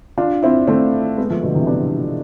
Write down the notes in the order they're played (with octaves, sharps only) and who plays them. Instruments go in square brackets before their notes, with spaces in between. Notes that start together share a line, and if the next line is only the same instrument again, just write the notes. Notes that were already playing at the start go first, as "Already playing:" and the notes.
[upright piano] D4 F4
C4 E4
A3 C4
G#3 B3
F3 A3
B2 D3
C3 E3
B3 D4